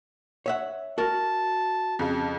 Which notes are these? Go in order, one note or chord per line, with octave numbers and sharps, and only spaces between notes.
C#5 E5 F#5
F#4 A#4 A5
F2 C#3